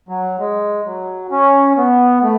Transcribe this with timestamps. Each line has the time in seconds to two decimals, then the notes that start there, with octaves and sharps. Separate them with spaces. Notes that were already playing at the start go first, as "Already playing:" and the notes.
0.09 F#3
0.40 G#3
0.85 F#3
1.31 C#4
1.77 B3
2.23 A3